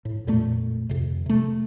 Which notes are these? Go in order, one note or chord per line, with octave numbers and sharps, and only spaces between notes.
A2
F2 A#2 A3
F2 C3
C3 A3